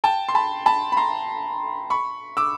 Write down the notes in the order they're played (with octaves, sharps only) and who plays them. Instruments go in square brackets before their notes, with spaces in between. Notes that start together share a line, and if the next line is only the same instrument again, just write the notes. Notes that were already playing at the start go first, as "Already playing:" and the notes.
[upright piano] G5 A5
C6
A5 B5
A5 B5
B5
A#5 C6
B5 C#6
D6 E6